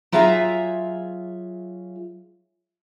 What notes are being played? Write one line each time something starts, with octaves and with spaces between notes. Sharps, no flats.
F#3 F4 G#4 E5 G#5 A#5